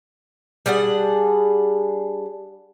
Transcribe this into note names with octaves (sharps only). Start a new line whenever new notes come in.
G3 D4 G#4 F#5